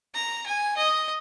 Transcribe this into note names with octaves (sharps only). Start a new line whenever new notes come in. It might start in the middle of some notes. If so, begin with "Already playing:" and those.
A#5
G#5
D#5